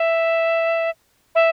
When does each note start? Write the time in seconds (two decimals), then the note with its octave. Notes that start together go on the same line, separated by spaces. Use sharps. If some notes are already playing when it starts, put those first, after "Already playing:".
Already playing: E5
1.35 E5